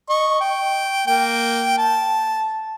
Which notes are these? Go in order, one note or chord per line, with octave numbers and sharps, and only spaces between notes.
D#5 C#6
G5
A#3 G5
A5